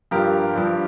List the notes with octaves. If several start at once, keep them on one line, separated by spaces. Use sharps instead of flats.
G2 F3 G4 A#4
G2 F3